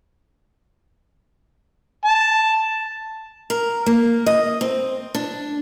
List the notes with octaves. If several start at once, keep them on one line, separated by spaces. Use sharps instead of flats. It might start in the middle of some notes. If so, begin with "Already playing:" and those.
A5
A#4
A#3
D#5
C4
D4